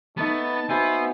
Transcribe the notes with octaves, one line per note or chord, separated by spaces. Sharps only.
A3 B3 D#4 B4 A5
B3 F#4 B4 C5 E5 G#5